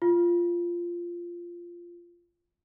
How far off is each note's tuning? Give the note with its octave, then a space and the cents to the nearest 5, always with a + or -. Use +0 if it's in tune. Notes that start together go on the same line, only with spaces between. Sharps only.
F4 -10